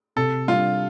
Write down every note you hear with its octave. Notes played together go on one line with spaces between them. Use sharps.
C3 A4
G3 D4 F4